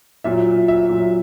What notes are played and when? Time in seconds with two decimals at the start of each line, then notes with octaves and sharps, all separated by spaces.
0.24 A#2 F#3 E5
0.68 E5
0.89 A#2 F#3